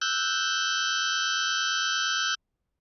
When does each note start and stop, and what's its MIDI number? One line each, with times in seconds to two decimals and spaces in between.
0.02 2.35 88
0.02 2.35 90
0.02 2.35 91